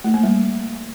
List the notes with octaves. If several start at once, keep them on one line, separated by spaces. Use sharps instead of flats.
A3
A#3
G3